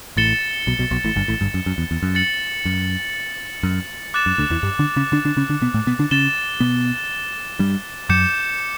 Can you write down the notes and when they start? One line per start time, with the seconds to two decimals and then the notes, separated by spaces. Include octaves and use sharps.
0.17 A1 A2 A6 C#7 E7 G7
0.67 B1 B2
0.79 B1 B2
0.91 B1 B2
1.04 A1 A2
1.16 G1 G2
1.28 A1 A2
1.41 G1 G2
1.54 F#2
1.66 F#2
1.78 E2
1.91 E2
2.03 F#2
2.15 A6 C#7 F#7
2.65 F#2
3.63 F#2
4.14 D6 F#6 A6 E7
4.26 F#2
4.38 D2 D3
4.50 E2 E3
4.63 G2 G3
4.79 D3 D4
4.96 C#3 C#4
5.12 D3 D4
5.25 D3 D4
5.37 C#3 C#4
5.49 D3 D4
5.61 B2 B3
5.74 A2 A3
5.87 B2 B3
5.99 D3 D4
6.11 C#3 C#4 A6 E7 G7
6.60 B2 B3
7.59 G2 G3
8.09 F#2 F#3 D6 G6 C#7 E7